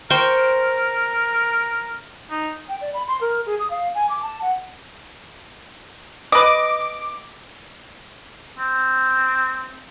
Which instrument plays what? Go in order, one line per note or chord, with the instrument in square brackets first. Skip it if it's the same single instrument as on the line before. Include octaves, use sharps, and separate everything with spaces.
[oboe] A#4 [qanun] C5 G5 C#6
[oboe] D#4
[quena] G5
D5
B5
C6
A#4
G#4
D#6
F5
G#5
D6
A5
F#5
[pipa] B4 D#5 [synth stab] D6
[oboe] C4